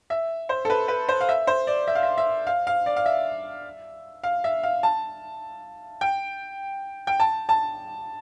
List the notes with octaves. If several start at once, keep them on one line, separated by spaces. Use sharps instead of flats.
E5
C5
A4
B4
B4
C5
F5
E5
C5
D5
E5
F5
E5
E5
F5
F5
D5
F5
E5
F5
E5
F5
A5
G5
G5
A5
A5